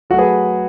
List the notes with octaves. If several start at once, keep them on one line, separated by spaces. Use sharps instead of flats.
F#3 A3 F#4 A4
G#4 B4